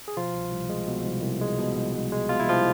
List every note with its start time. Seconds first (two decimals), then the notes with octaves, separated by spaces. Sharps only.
0.08 G#4
0.17 B2 F3 F4
0.34 C2
0.52 C2
0.69 G#3
0.88 B2
1.05 C2
1.22 C2
1.41 G#3
1.59 B2
1.76 C2
1.94 C2
2.12 G#3
2.29 B2 F4
2.40 E4
2.47 C2 F3 F4